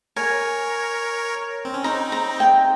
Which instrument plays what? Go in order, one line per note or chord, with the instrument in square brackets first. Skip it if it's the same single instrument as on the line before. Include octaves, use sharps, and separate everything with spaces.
[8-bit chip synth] A#4 C#5 [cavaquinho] G#5
[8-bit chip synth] C4
C#4
[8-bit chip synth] C4 D#4 [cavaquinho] A#5
[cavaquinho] A#5
G5